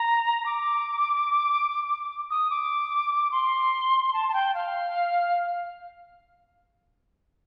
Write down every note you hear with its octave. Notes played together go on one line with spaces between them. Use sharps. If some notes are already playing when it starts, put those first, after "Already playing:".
Already playing: A#5
D6
D#6
D6
C6
A5
A5
G5
F5